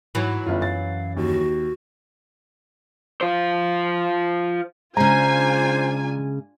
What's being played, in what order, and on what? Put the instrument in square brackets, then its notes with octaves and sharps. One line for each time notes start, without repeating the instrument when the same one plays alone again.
[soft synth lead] G#2 [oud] E3 F#3
[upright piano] G1 F4 [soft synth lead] F#2
[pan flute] F5 [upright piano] A6
[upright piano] D#2 [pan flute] F#4
[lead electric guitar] F4 C5
[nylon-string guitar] C#3 G#3 [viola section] D4 F4 G#5 [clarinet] C5 [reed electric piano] A#5